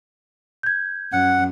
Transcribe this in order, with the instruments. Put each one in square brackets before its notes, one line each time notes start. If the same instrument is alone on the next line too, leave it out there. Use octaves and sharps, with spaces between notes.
[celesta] G6 G#6
[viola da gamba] F#2 [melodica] F#5